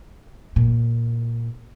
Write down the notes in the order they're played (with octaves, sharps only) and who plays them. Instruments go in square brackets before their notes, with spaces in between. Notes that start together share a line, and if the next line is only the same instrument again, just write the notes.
[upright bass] A#2